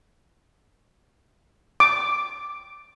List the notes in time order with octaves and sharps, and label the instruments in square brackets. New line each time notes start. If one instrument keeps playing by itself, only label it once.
[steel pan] D6